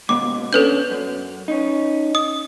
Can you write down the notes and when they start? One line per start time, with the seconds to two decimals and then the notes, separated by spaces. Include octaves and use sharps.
0.09 D#2 G#2 B2 D6
0.53 C#4 D4 A4 B4 G6
0.91 F#2
1.48 C#4 D#4
2.15 D#6